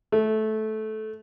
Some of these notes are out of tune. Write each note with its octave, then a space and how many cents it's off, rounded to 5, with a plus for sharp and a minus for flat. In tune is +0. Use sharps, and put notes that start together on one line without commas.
A3 -15